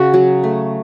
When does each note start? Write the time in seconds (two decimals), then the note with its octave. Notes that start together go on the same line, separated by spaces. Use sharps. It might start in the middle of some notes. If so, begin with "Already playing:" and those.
Already playing: C#3 F#4
0.13 F#3
0.44 A3